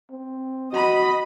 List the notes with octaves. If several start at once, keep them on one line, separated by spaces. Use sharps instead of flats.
C4
F#4 D#5 B5